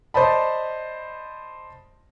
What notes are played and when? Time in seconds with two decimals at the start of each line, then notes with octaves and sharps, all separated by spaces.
0.14 C5 D5 D#5 A5 B5